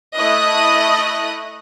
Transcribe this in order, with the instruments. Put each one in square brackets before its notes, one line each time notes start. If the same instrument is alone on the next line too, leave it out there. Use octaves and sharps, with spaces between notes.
[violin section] A3 E4 D#5 D#6 F#6